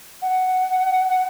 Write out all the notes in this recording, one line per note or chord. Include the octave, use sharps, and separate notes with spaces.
F#5